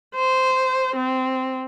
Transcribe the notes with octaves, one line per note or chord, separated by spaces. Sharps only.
C5
C4